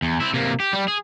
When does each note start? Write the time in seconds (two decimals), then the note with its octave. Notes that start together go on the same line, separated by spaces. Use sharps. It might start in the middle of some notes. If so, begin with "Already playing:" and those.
0.02 E2
0.20 C4 E4
0.34 C3 A#3
0.60 G4
0.73 G3
0.88 G#4